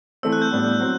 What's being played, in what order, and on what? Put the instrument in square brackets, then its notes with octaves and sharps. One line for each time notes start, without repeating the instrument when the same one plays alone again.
[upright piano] E3 A3 C4 [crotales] E6
[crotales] F#6
G6
[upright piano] A2 G3 B3 D4
F#3 C4